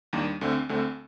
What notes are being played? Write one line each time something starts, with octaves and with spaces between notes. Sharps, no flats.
D#2 D#3 G3 A#3 D4
D2 D3 A3 C4
D2 D3 A3 C4